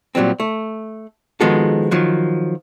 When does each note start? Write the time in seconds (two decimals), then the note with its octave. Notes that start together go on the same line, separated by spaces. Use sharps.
0.15 A#2 F#3 G3 C4
0.40 A3
1.41 D#3 F3 G#3 B3 F#4 A4
1.91 D#3 F3 F#3